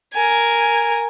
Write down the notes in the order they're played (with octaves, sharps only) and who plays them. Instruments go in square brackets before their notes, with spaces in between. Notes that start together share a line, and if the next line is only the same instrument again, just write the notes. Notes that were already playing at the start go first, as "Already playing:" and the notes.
[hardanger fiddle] A#4 G#5